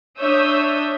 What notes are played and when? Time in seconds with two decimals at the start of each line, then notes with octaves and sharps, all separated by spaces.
0.19 D4 C#5 E5 D#6 E6 G6